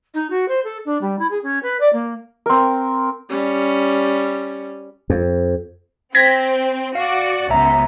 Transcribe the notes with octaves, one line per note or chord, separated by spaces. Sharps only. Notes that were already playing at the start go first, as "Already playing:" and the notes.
D#4
F#4
C5
A4
D4
G3
E4
G#4
C#4
B4
D5
A#3
C4 A#4
G3 C#4
F2
C4 G#6 A#6 B6
F#4 D5 F5
C#2 F#2 B3 E5 A#5